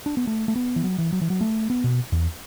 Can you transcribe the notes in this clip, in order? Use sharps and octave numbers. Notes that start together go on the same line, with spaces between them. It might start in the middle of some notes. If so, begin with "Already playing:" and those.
D4
B3
A3
A3
B3
E3
F#3
E3
F#3
E3
F#3
A3
B3
B2
E2